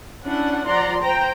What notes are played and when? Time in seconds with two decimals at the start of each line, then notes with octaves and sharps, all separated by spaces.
0.24 C#4 D4 E4 F#5
0.67 F3 D5 F#5 A#5 C6
1.03 C5 G5 A#5